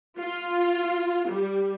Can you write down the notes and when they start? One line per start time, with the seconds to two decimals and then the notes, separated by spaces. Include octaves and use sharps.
0.20 F4
1.29 G3